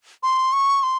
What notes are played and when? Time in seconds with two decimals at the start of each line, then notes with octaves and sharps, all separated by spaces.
0.23 C6
0.53 C#6
0.83 C6